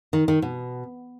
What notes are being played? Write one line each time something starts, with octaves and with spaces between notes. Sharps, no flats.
D#3
D#3
B2